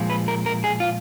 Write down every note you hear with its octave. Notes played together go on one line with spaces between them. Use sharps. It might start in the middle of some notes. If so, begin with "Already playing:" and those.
Already playing: A#2 F3 G#3
B4
A#4
A#4
G#4
F4